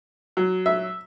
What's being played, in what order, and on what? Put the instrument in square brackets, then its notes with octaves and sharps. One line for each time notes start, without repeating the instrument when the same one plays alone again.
[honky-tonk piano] F#3
[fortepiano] E5